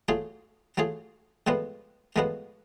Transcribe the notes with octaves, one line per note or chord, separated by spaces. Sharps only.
F#3 A3 F4 G#4
F#3 A3 F4 G#4
A2 F3 G#3 B3 F#4
A2 F3 G#3 B3 F#4